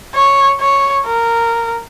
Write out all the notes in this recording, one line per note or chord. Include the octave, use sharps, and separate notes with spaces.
C#5
C#5
A#4